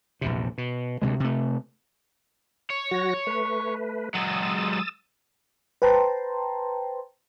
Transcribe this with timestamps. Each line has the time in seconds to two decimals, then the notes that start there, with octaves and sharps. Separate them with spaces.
0.21 A#1 E2 C3
0.58 B2
1.02 D2 C3 E3 G#3
1.20 C3 A3
2.70 C#5
2.91 F#3 F#4 A#6
3.27 A3 B4
4.15 F#3 G#3 D#6 E6 A6
5.82 B4 C5 G5 A5 A#5 C6